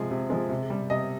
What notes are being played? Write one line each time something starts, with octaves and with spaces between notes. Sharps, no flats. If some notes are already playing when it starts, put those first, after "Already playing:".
Already playing: C3 F3 G#3 G#4
C3
F3 G#3
C3
G3
C3 D#5